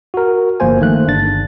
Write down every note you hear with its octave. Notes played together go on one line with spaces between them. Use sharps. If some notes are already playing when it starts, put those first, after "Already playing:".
F#4 A#4
G1 F3 A#3 C5 G#5
D#3 A3 A#3 F#6
G1 D4 A6